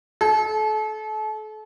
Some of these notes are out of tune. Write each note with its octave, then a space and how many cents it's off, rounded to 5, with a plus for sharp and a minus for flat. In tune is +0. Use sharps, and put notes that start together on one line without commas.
A4 -35